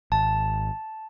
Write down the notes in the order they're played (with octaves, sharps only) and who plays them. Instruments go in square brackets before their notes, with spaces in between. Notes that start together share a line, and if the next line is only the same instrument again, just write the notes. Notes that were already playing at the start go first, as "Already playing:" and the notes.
[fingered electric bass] G#1 [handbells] A5